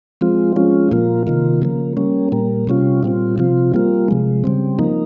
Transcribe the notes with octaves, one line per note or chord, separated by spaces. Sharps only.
F3 G#3 C4 F4
F3 G#3 C#4 F4
A#2 F3 A#3 F4
C3 D#3 A#3 F4
C#3 F3 A#3
G3 A#3 C#4
A#2 G3 A#3
C3 G3 C#4 F4
A#2 G3 C4 F4
C3 F3 C4 F4
G3 A#3 F4
C3 F3 G#3
C#3 G3 C4
F3 A#3 D#4